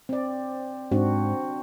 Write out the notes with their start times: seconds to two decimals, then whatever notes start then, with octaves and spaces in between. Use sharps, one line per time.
0.09 C4 D5
0.92 G#2 C4 D4 F#4